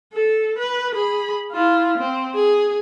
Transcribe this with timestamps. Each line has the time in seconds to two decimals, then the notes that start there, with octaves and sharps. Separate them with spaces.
0.13 A4
0.59 B4
0.95 G#4 B5
1.52 E4 F4
1.98 C4
2.35 G#4